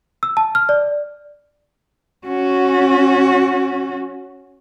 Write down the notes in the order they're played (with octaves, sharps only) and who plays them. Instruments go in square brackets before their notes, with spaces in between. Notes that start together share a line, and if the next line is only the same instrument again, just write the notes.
[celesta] E6
A5
F6
D5
[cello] C#4 F#4